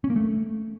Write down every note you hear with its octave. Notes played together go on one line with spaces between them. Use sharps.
C#4
A#3
A3